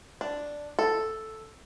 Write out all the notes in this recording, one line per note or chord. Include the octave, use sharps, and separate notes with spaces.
D4
A4